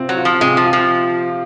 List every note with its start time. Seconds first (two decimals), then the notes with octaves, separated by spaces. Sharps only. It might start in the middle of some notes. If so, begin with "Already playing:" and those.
Already playing: C3 C4 F4
0.09 F#3
0.17 F4
0.25 F3
0.41 C3 G#3
0.57 F3
0.65 F4
0.73 F3